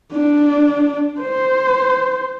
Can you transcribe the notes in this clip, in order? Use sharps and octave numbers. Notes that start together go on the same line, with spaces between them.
D4
C5